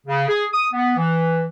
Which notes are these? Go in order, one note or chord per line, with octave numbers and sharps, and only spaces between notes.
C#3
G#4
D#6
B3
E3